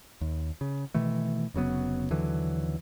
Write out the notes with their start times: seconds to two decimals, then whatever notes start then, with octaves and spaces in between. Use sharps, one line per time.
0.21 D#2
0.61 C#3
0.94 B2 D#3 E3 A3
1.54 F1 C#3 F#3 B3
2.10 D#2 D3 E3 F#3